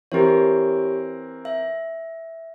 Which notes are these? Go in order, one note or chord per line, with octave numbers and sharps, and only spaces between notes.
E3 C4 G4 A#4 C#5
E5